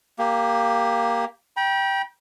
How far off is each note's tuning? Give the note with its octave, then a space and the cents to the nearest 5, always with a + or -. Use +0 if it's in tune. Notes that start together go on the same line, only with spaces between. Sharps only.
A#3 +0 G4 +10
G5 +0 B5 -45